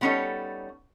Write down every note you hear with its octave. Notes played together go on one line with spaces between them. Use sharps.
G3 B3 C#4 D#4 A4 C#5